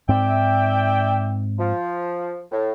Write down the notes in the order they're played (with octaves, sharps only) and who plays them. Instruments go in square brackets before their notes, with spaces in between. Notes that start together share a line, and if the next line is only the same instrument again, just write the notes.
[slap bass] G#2 C4 [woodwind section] D5 E5 G5
[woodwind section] F3
A2